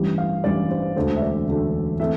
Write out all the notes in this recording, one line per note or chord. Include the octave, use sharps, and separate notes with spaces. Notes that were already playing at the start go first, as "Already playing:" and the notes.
Already playing: A1 G2 E3 G3
F5
A1 G2 E3 G3 D5
C5
E1 D2 D3 A3 C5
E5
D5
E1 D2 D3 A3
E3 A3 C4 E5